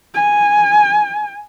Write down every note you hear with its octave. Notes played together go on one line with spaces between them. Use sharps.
G#5